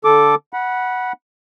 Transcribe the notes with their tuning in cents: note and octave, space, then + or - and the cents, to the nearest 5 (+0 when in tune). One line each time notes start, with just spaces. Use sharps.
D3 -15 A4 -5 D6 +0
F#5 +0 B5 -25